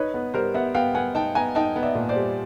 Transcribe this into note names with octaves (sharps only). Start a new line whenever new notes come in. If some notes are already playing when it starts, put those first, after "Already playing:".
Already playing: D#4 B4 C#5
B3
G3 A#4 C5
B3 E5 F#5
B3 F5 G5
B3 F#5 G#5
D#4 G5 A5
B3 G#5 A#5
D#4 G5 A5
B3
D5 E5
A#2
C5 D5
G3